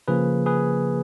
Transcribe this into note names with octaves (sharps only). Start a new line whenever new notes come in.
C#3 F3 A#3 G#4 B4
G#4 B4